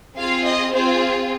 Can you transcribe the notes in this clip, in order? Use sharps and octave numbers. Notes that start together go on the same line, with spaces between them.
C4 F4 G#4 F5
D#5
C4 F4 G#4 C5